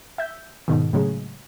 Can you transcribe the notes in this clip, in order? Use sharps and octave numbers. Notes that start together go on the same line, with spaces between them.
E5 G6
G#2 B2 D#3
A2 C#3 F#3 G#3